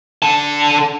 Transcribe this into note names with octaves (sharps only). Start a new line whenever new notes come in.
D3 A5